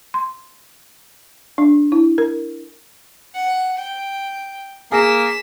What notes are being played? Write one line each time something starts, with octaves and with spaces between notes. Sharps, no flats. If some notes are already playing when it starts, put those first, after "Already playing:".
C6
D4
E4
A#4
F#5
G5
A#3 G#4 B6 E7